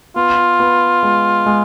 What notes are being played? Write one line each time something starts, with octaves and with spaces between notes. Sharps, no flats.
B3 F4
B3
G#3
G#3